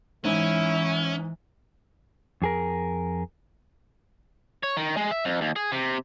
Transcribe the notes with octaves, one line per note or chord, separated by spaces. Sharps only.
G#2 E3 C#4 E4
F2 G#4 A#4
C#5
D#3
G#3
E5
F2
D#2
G#4
C3